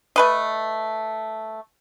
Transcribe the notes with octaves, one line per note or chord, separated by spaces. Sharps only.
A3 B4 D#5